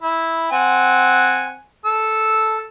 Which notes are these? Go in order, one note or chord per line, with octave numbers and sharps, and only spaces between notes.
E4
C4 F#5 G#5
A4 E6